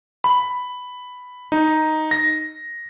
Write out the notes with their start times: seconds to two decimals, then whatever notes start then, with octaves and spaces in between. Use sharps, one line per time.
0.24 B5
1.52 D#4
2.11 A#6